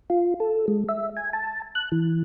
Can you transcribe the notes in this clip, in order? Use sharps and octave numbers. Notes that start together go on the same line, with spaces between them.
F4
A4
G#3
E5
G#5
A5
F#6
E3